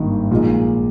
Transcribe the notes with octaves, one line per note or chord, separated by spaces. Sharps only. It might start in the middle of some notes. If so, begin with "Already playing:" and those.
Already playing: G#1 G2 D#3 A#3 D#4
A#1 A#2 G#3 D#4